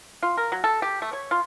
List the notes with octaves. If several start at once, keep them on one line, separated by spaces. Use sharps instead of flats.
F4
A#4
F#3
A4
G4
A3
C#5
F4